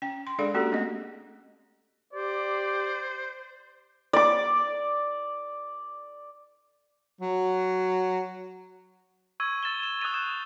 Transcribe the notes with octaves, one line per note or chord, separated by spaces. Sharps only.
C#4 G5
C6
G#3 D4 G#4 A4 D5 F5
A#3 C#4 F#4 G4 A4
A3 C4 D#5
G4 C5 D5
D5 D6
F#3
C#6 E6 G#6 D#7
E6 A6 E7 G7
E7
D#6 F#6 G#6 A6 D#7 F7
G6 E7